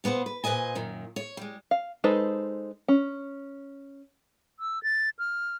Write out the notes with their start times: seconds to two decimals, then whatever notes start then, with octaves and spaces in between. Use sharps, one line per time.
0.04 A#2 B3 B4 C5
0.26 B4
0.44 A#2 B4 C5 D#5 G#5
0.75 F#2 A#2 D#3
1.16 C#5
1.37 G3 G#3
1.71 F5
2.04 G#3 D#4 A4 B4 C5
2.88 C#4
4.60 E6
4.83 A6
5.19 F6